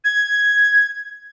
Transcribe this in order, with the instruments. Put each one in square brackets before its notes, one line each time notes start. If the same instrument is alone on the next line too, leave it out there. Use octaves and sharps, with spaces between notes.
[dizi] G#6